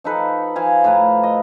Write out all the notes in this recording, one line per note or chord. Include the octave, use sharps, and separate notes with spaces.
F3 D#4 A4 B4
F3 F5 G#5
A2 B4 A#5
D#5